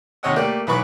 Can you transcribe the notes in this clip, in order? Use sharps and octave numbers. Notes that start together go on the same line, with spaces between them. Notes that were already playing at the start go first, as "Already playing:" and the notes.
D#2 C3 C#5 D#5 F#5 E6
A3 A#3 G4 D5
B1 E3 B4 B5 C#6 D6